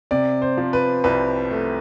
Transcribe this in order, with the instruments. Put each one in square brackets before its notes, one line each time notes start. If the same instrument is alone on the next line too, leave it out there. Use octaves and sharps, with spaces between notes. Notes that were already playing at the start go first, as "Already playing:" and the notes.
[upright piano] C3 D5
C5
F3
B4
C2 B4
A3